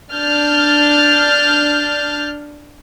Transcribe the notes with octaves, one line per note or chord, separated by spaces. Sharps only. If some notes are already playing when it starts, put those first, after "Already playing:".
D4 F6 G6 A6